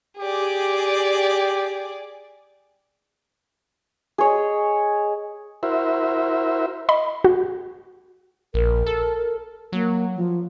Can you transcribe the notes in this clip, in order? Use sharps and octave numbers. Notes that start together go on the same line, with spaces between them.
G4 G#4 D5
G#4 C#5 D#5
E4 F#4 A#4 C5 E5
D#5 B5
F#4
A#1 A#4
A4
F#3 A#3
F3